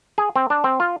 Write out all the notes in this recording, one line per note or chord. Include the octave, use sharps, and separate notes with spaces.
G#4
C4
D4
C4
F4